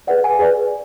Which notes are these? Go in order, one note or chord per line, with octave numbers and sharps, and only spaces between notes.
G#4 B4 D5 F#5
G#5
G#4 B4 D5